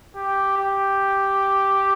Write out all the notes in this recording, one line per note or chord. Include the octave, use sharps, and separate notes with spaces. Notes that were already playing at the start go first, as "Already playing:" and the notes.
G4
G4